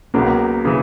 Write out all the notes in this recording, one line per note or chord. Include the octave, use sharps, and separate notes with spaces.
C#2 C#3 F#3 A#3 B3
C#3 E3